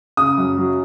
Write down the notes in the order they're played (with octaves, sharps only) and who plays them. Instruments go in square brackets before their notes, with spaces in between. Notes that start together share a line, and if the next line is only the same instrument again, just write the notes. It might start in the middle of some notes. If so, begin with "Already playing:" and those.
[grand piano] C#3 D#6
F#2
F#3